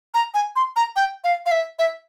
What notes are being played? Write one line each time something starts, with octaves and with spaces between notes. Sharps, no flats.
A#5
G#5
C6
A#5
G5
F5
F5
E5
E5